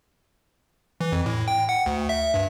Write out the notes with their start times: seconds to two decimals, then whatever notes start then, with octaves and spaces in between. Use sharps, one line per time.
1.01 E3
1.12 F2
1.26 A2
1.48 G5
1.69 F#5
1.86 D2
2.09 E5
2.34 G2